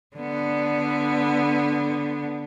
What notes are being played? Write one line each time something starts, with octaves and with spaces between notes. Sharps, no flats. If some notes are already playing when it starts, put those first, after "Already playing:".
D3 B3